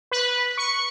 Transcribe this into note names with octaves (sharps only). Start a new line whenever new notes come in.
B4
C#6